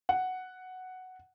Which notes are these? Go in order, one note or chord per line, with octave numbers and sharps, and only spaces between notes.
F#5